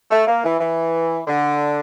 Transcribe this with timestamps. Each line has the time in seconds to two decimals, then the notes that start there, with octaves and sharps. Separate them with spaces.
0.11 A3
0.27 A#3
0.44 E3
0.60 E3
1.27 D3